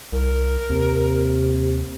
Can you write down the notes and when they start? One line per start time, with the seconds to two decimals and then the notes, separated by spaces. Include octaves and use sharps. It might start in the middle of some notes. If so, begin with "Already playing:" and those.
0.12 C2 A#4
0.70 D#2 C3